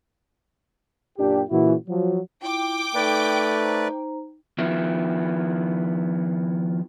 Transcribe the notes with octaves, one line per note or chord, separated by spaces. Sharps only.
F#2 A#2 D4 G4
A#2 C#3 E3 E4 F#4
F3 F#3
E4 F4 G5 D6
A3 D#4 A4 B4 D5
D#4 C5 A#5
D#3 F3 B3 E4